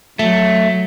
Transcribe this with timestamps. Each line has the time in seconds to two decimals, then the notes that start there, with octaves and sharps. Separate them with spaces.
0.19 F#3 A3